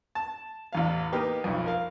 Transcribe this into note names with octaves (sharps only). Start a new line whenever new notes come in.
A5
A1 E2 F5
A#3 B3 D#4 G4
B1 F2
A#4 F5